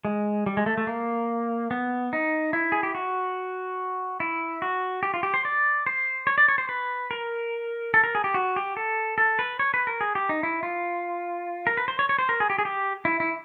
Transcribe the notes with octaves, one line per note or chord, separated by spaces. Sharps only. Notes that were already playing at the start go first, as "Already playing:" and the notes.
G#3
G3
G#3
A3
A3
A#3
B3
D#4
E4
G#4
G4
F#4
E4
F#4
G4
F4
G4
C5
D5
C5
C#5
D5
C#5
C5
B4
A#4
A4
A#4
G#4
G4
F#4
G4
A4
A4
B4
C#5
B4
A#4
G#4
G4
D#4
E4
F4
A#4
B4
C5
C#5
C#5
C5
A#4
G#4
G4
G#4
G4
E4
E4